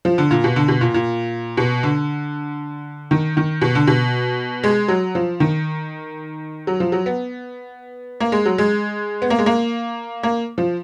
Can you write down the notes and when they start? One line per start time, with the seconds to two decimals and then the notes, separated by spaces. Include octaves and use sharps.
0.05 F3
0.18 D3
0.31 A#2
0.44 B2
0.56 D3
0.68 B2
0.81 A#2
0.94 A#2
1.57 B2
1.83 D3
3.11 D#3
3.37 D#3
3.61 B2
3.75 D3
3.87 B2
4.64 G#3
4.88 F#3
5.15 F3
5.40 D#3
6.67 F#3
6.80 F3
6.92 F#3
7.06 B3
8.20 A#3
8.32 G#3
8.46 F#3
8.58 G#3
9.22 B3
9.30 A#3
9.39 G#3
9.46 A#3
10.23 A#3
10.58 F3